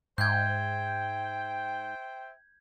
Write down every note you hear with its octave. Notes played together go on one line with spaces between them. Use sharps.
G#2 C5 E5 G5 G6 G#6